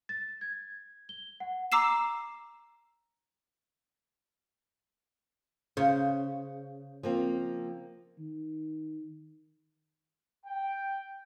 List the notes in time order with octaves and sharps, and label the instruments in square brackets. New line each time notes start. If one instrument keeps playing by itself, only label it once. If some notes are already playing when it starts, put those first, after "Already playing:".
[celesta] A6
G#6
G7
F#5
[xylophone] A#5 D6 E6 C7 E7
[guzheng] C#3 [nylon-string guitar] C5
[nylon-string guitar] F3 A#3 C4
[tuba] D#3
[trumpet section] G5